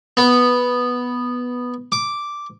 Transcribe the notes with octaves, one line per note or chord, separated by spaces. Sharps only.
B3
D6